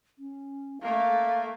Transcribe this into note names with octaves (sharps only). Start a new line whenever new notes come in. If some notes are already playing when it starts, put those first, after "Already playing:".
C#4
A3 A#3 F5